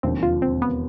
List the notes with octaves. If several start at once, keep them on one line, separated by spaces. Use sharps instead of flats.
E1 D#2 D3 F3 C4
F4
C4
B3